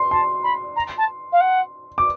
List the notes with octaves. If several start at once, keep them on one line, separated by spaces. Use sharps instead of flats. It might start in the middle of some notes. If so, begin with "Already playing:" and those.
Already playing: C6
A5 C6
B5
A#5
A5
F5
F#5
D6